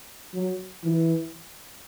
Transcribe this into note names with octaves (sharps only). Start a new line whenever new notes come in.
F#3
E3